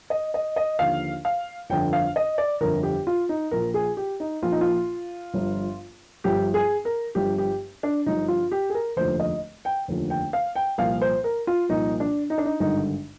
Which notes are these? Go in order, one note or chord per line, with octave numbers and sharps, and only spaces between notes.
D#5
D#5
D#5
D#2 D3 F3 F5
F5
G1 F2 D3 F3 G5
F5
D#5
D5
G1 F2 D3 F3 A#4
G4
F4
D#4
A#1 A#2 F3 A#4
G#4
G4
D#4
A#1 A#2 F3 F4
D#4
F4
G1 G2 F3
G1 G2 F3 G4
G#4
A#4
G1 G2 F3 G4
G4
D4
G1 G2 F3 D#4
F4
G4
G#4
A#4
F1 D#2 D3 F3 C5
D#5
G5
F1 D#2 D3 F3
G5
F5
G5
C2 A#2 F3 F5
C5
A#4
F4
C2 A#2 F3 D#4
D4
D#4
D4
D#4
G#1 G2 D3 D#4